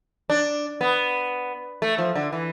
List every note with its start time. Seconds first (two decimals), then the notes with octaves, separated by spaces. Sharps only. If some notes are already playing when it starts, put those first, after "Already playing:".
0.30 D4
0.81 B3
1.82 A3
1.98 F3
2.15 D3
2.32 E3